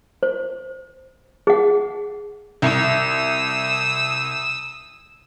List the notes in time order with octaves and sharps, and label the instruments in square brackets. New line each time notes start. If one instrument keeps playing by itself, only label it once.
[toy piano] C5
G#4 F#5
[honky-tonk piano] C2 [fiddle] D#6 E6